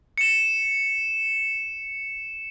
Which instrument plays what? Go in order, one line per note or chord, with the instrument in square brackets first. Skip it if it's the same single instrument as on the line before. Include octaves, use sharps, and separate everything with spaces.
[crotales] C#7 E7